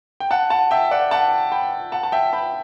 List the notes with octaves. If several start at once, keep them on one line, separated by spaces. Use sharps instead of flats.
G5
F#5 A5
F#5 A5
E5 G5
D5 F#5
F#5 A5
G5 B5
F#5 A5
A5
E5 G5
G5 B5